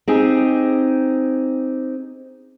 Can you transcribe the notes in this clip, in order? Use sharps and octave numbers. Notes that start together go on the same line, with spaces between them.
C4 D#4 G4 G#4